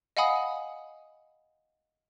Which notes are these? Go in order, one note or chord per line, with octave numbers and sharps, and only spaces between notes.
D#5 F5 F#5 G#5 B5 D#6